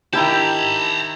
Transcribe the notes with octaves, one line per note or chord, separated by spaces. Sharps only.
D#3 E4 G4 G5 A5 A#5